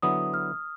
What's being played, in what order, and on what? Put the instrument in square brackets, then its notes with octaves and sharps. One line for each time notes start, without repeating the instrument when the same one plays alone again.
[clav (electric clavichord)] D3 F#3 B3 E4 [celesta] D#6
[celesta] F6